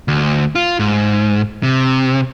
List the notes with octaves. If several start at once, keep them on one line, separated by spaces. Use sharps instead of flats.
D2
F4
G#2
C3